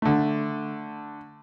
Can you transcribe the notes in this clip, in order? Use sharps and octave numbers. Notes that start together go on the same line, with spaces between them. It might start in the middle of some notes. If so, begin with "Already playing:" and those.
D3 A3